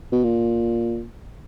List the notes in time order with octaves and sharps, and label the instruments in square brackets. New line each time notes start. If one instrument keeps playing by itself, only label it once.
[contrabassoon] B2
A#2